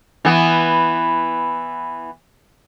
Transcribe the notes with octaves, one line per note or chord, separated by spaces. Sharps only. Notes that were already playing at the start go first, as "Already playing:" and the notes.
E3 B3